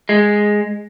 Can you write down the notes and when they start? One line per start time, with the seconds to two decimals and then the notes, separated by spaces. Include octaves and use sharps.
0.09 G#3